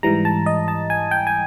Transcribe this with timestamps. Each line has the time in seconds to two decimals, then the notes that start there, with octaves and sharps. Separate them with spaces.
0.03 G#2 E3 G3 A#5
0.25 A5
0.46 D#5
0.68 A5
0.90 G#5
1.11 G5
1.27 G#5